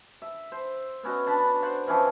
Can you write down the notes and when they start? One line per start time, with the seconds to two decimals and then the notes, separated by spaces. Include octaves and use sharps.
0.22 E5
0.52 C5
1.03 B3 C#4 F#4 D#5
1.27 D4 A5 B5
1.62 C5 D5 F#5
1.87 E3 F3 C#4 D#4